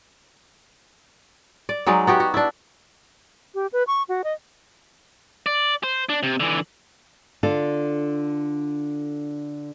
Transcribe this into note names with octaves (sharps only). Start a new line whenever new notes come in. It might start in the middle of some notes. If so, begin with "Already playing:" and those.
D5
F#3 G#3 D#4 D5
B3 F#4 G4
F#4
D4 E4
G4
B4
C#6
F#4
D#5
D5
C5
D4
C3
D3 E3
D3 D4 F4 A4